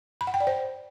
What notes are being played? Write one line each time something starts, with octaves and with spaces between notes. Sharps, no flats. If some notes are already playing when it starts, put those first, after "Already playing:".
B5
F#5
G5
D5
C5